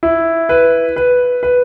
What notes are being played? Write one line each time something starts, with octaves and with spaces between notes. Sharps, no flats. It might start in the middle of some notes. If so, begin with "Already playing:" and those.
E4
B4
B4
B4